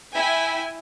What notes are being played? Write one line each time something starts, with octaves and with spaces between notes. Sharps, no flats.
E4 E5 G5 G#5